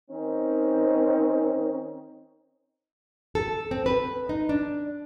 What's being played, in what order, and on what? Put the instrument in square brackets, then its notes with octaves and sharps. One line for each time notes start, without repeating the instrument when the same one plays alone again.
[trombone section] D#3 C4 C#4 D#4
[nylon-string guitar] A4
C4
B4
D#4
D4